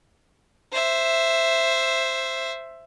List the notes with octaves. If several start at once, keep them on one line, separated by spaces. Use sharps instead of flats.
C5 E5